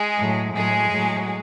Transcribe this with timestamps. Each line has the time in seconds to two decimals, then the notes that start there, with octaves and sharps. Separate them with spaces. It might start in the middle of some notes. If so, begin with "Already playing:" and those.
Already playing: G#3 G#4
0.19 A2 F#3
0.54 A2 F#3 G#3 G#4
0.90 A2 F#3